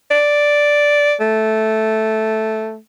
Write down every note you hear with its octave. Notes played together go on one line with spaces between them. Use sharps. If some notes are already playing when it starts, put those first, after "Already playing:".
D5
A3